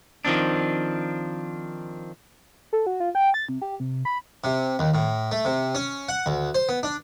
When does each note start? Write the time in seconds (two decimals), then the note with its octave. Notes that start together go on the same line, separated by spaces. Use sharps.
0.25 D#3 F3 C4 D4
2.73 A4
2.86 F#4
3.00 F4
3.15 G5
3.34 A6
3.49 C3
3.62 G4
3.80 C3
4.05 B5
4.44 C3
4.79 D#2
4.94 A2
5.31 A3
5.45 C3
5.75 C#4
6.09 F#5
6.26 D2
6.55 C5
6.69 B3
6.83 D4